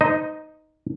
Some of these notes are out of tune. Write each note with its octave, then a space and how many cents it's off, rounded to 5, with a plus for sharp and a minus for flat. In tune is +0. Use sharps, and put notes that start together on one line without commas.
D#4 +0 C5 -35 D#5 +0